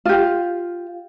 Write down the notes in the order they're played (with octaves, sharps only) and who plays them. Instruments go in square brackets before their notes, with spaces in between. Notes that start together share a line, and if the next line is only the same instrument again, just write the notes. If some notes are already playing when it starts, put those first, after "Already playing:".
[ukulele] F4 G4